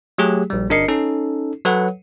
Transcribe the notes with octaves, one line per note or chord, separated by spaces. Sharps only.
F#3 A3 G4 G#4
A#1 G3
G1 D4 A#4 D#5 C7 C#7
C#4 D#4 A4
F#3 A4 B4 C#5 F#5